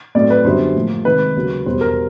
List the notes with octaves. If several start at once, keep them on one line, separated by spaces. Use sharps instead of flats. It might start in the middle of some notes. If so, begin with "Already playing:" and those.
A2 F#3 A3 C4 D#4 D5
B4
F#2 D3 G3 B3 C5
A2 F3 A#3
C3 D#3 G#3 B4
D#2 C#3 F#3 A#3
E2 B2 G3 B3 C5
A#4